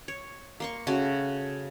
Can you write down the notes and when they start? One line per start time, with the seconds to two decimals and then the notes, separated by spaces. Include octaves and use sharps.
0.08 C#5
0.60 A#3 C6 C#6
0.87 C#3 A3 F#4